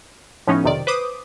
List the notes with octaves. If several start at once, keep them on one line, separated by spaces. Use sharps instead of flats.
A2 F3 B3 C#4 D#4
B1 F2 C3 D#3 D5
B4 C5 D6 D#6